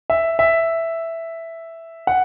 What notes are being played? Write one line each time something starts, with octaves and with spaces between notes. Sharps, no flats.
E5
E5
F#5